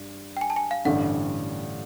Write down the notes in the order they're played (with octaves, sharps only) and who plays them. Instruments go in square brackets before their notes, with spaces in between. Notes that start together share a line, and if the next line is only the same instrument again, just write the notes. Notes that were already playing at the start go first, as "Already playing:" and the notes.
Already playing: [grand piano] G2
[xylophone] G5
G#5
A5
G#5
F5
[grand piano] A1 G2 D3 [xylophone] F#5